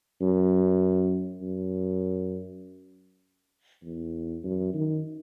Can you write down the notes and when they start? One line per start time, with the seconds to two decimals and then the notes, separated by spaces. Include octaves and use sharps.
0.21 F#2
1.42 F#2
3.84 E2
4.44 F#2
4.74 D#3